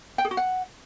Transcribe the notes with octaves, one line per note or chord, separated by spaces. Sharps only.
G5
G#4
F#4
F#5